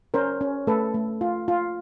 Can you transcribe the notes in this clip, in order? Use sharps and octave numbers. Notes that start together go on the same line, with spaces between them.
C#4 A#4 C5
C#4
A3 A4 B4
A3
F4
F4